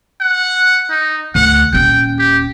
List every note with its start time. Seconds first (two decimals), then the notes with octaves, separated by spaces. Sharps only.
0.20 F#5
0.90 D#4
1.35 D2 F#5
1.73 D#1 C#4 G5
2.19 G4